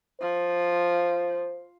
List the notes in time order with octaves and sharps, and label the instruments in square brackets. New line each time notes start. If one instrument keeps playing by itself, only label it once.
[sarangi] F3 [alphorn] C5